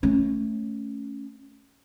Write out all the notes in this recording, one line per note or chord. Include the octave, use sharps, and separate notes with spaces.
A3 C#4